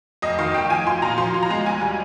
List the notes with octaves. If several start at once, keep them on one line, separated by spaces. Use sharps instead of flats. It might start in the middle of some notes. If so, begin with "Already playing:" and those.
F1 D#5
D#3 F5
F1 G5
F3 G#5
F3 C6
A#2 A#5
F3 C6
F3
A#5
G#3
D#2 G#5
G3